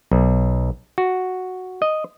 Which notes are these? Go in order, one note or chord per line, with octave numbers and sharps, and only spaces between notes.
B1
F#4
D#5